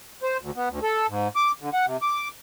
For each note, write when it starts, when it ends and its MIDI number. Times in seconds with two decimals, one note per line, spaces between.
0.23 0.37 72
0.41 0.51 38
0.56 0.69 59
0.70 0.79 38
0.83 1.07 69
1.09 1.28 44
1.36 1.52 86
1.61 1.70 50
1.73 1.86 78
1.86 1.97 48
2.02 2.28 86